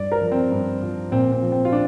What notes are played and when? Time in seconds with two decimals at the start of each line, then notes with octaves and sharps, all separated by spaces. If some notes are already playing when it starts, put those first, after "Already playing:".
Already playing: G2 D5
0.12 A#4
0.21 F3
0.32 C4
0.52 G2
0.82 F3
1.12 A#2 C4
1.32 C4
1.43 F3
1.52 C4
1.65 F4
1.72 D4